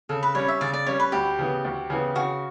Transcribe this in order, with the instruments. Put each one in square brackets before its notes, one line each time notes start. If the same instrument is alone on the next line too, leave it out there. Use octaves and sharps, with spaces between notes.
[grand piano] C#3 [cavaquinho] A4
[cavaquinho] B4
[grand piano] G3 C#4 [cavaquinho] C#5
[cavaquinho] E5
[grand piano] C#3 [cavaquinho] D5
[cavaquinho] D5
[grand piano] G3 C#4 [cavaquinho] C#5
[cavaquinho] B4
[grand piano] D2 [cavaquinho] G4
[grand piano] C#3 E3 B3
D2
C#3 E3 B3
[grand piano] C#3 [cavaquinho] F#4